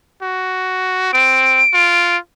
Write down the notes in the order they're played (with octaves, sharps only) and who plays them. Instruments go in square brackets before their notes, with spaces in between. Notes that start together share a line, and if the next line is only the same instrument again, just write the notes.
[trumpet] F#4
[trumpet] C4 [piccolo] D7
[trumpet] F4